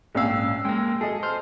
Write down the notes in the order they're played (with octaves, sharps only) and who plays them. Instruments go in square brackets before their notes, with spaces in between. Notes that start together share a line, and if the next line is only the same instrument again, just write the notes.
[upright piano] A#1 C#4 E6 [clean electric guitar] G#2 F5
[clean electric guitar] G#3 A#3 [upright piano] G5
[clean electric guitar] G#4 [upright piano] A4 D#5
[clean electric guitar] C5 [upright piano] F6